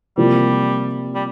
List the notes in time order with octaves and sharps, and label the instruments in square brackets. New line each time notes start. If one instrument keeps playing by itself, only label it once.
[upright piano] C3 F3 A#3 [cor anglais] G3
[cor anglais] G3